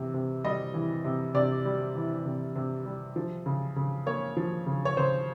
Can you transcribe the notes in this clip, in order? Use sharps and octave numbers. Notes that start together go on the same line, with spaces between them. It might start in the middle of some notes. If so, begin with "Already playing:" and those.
Already playing: C3 E3
C3
G3 D#5
E3
C3
C3 D5
G3
E3
C3
C3
G3
F3
C#3
C#3
A#3 C#5
F3
C#3
C#5
C#3 C5